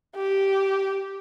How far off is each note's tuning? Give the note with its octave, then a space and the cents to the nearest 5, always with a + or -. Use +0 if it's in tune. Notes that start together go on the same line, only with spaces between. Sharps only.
G4 -10